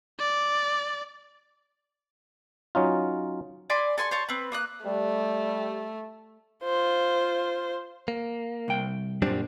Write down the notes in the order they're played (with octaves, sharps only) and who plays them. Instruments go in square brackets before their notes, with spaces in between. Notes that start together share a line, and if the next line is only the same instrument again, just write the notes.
[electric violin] D5
[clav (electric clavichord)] F#3 C#4 D#4 F4
[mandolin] D5 G#5 B5 C6
A4 G#5 C6 C#6
C5 C#5 A5 C#6
C4 B4
A#3 D#6 F#6
[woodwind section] G3 [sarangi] A3
[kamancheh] F4 C5
[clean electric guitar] A#3
[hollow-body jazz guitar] C2 G5
[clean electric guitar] F#2 G3 C4 [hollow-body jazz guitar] A#2 D4